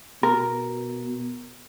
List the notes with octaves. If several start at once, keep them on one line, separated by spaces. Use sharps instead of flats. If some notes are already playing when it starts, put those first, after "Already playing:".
B2 A#4